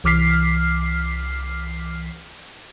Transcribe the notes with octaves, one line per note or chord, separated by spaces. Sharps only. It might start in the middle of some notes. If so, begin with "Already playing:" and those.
C2 E3 D6 F6 B6 C7